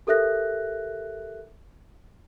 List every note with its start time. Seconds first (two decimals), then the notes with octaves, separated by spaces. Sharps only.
0.07 G4 A4 A#4 E5 F#6 A#6